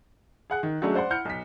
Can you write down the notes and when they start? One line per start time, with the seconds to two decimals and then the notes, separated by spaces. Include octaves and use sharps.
0.50 G#4 F#5 F#6
0.63 D#3
0.82 F#3 G#3 A3 C#4 D4 G#4
0.95 C5 D5 F#5 C6
1.10 E4 F#5 F6 G6 C#7
1.25 B1 B6